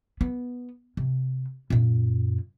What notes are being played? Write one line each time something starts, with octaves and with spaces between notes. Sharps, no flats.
B3
C3
F#2 A#2